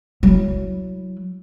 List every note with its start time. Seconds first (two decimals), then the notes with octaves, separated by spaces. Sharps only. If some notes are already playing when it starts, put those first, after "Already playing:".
0.23 F#3 E4